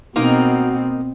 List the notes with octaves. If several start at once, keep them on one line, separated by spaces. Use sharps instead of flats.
B2 A#3 C4 D#4 F#4 A#4